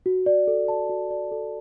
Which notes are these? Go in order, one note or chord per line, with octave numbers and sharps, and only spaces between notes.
F#4
D5
A4
A5
F#4
D5
A4